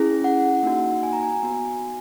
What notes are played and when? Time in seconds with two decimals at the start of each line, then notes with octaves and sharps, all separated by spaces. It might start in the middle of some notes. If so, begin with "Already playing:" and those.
Already playing: C#4 E4 G#4
0.24 F#5
0.63 A#3 D#4 F#4
1.03 G#5
1.13 A#5
1.23 G#5
1.43 B3 F#4